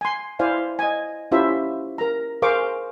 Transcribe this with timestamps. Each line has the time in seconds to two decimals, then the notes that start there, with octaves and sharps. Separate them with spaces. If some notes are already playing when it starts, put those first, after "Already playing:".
0.01 G#5 C6
0.39 E4 C5 D5 F5 G#5
0.79 D#5 G#5
1.31 C#4 E4 F4 G4 C5 E5
1.98 A#4 A#5
2.42 G#4 A#4 C5 F5 C#6 D6